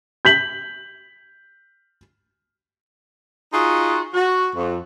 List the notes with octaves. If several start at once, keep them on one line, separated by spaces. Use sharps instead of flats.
G6 B6 F#7
D#4 F4 F#4 G#4
F#4
F2